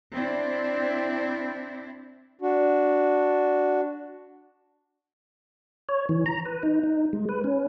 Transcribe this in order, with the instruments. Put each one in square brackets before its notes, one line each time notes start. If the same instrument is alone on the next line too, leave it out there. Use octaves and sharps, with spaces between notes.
[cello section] C4 D4 E4
[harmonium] D4 F#4
[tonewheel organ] C#5
E3
A#5
B4
D#4
D#4
G#3
B4
C#4